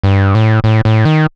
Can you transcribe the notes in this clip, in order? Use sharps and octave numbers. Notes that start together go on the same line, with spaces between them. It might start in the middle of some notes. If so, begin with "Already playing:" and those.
G2
A2
A2
A2
D#3